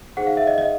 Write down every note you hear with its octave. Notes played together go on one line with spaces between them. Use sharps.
D#4 G#4 C5 F#5
F5
E5
D#5
D#5